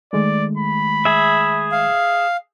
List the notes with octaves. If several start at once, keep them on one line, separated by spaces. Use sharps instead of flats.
D#3 G#3 A3 D5
B5
G#4 E5
F5